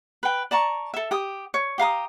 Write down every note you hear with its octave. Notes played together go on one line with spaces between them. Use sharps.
B4 G5
D5 A5 A#5 C#6
A4 E5
G4 D#6
C#5
G4 F5 A#5 D#6